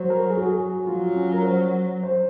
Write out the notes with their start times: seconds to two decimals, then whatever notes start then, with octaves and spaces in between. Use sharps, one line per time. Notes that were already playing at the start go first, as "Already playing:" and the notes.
Already playing: F#3 F#4 C5 C#5
0.10 A#4
0.29 G#4
0.37 F#4
0.46 G#4
0.87 F#3 F4
1.15 C#4
1.33 A#4
1.45 C5
2.03 C5